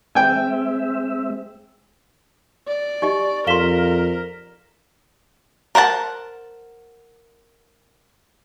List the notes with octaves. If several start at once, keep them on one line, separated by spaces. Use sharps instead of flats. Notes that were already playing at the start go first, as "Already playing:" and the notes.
G#3 C4 E5 G5 G#5
D5
D#4 G4 D#5 C#6
F2 A#4 F5 C6 B6 E7 G7
A#4 C5 F#5 A5